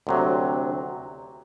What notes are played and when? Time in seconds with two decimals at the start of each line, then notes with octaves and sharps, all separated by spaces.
0.07 D2 C3 F#3